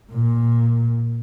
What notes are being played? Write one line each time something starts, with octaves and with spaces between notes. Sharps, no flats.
A#2